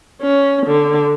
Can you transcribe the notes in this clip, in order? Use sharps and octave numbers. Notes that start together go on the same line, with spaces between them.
C#4
D3